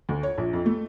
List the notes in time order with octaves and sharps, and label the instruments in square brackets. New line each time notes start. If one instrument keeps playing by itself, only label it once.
[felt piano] D2
C#5
A#1
F2
A3